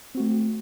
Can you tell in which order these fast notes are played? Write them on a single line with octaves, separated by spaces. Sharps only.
C4 F#4 A3